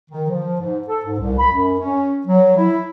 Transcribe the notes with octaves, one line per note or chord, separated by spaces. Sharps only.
D#3
F3
G#2
A4
G#2
C2
B5
F#2
C#4
F#3
E4